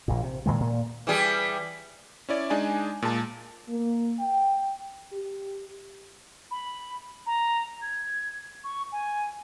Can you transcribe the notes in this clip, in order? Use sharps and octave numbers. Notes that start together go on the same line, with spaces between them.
A#1 A#2
C3
A#2 D3 D#3 G#3
A#2
E3 G3 G#4
C#4 E4 D5
G#3 D4 D#4 G#5
A#2 G#3 A5
A#3
G5
G4
B5
A#5
G#6
C#6
G#5